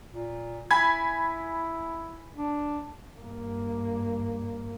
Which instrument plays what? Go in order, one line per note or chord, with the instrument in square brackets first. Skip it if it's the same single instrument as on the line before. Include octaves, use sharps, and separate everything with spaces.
[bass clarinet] A#2
[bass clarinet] E4 [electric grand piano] G#5 B5 G#6
[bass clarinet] D4
[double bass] G2 A#3